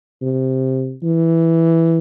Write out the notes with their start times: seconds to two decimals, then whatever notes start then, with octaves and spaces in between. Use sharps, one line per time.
0.22 C3
1.03 E3